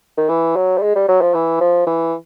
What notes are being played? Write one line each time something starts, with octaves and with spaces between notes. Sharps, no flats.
D#3
E3
F#3
G3
G#3
G3
F#3
F3
E3
F3
E3